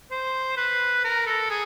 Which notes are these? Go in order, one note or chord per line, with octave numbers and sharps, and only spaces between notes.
C5
B4
A#4
A4
G#4